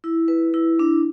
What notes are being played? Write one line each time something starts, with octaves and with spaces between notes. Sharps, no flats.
E4
B4
E4
D4